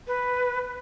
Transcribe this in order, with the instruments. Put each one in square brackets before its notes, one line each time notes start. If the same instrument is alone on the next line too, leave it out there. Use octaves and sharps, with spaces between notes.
[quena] B4